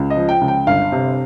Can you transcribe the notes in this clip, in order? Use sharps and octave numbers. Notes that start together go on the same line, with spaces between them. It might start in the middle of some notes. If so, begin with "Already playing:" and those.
Already playing: C#2
D#5
F3
G5
C#2
G5
G1 F5
C3